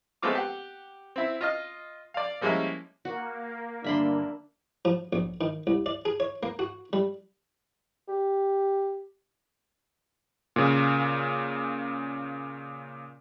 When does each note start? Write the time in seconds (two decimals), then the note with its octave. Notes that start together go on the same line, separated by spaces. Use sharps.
0.22 G#3 A3 B3 C4 F4 D6
0.35 G4 F#5
1.16 C4 E4
1.41 F4 D#5 F6
2.14 D5 F5
2.41 F3 G3 G#3 A#3 C#4 E4
3.05 A#3 F#4
3.84 G2 D3 D4 E5 B5 C6
4.85 F3
5.13 A#1
5.41 D#3
5.67 C2
5.86 D5
6.05 G#4
6.20 C#5
6.43 A#3
6.59 F#4
6.93 G3
8.08 G4
10.56 A#2 C#3